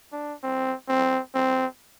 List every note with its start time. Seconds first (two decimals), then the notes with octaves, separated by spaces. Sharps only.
0.13 D4
0.43 C4
0.89 C4
1.35 C4